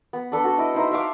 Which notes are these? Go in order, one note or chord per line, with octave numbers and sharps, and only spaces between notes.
B3
D4 A4 B4
F#4 A4
E4 D#5
D#4 E4 C5
E5 F5 D6